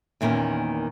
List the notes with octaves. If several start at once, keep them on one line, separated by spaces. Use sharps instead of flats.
E2 A#2 D#3 A#3 C#4